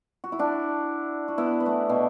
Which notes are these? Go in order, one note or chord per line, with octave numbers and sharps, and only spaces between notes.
F#4
E4
D4 F#4
F#4
B3 E4
B3
E3 A3
B2